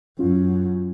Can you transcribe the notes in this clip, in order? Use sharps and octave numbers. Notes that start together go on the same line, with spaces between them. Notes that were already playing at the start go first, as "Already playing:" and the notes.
F#2 C#4 F4